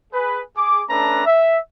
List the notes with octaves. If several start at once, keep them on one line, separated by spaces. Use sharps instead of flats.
G#4 B4
G#4 D6
A3 C#4 D4 A4 B4 A#5
E5